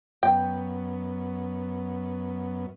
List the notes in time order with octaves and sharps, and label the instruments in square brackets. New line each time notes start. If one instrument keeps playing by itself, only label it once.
[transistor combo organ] F#2 B3 [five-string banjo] G5